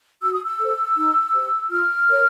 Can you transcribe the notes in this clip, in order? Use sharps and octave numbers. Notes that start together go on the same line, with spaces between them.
F#4 E6
D#6
E6
A4 C5
D#4
G4 C5
F4 F6
A#4 C#5